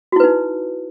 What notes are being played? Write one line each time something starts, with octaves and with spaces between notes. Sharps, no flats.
D#4 E4 F#4 B4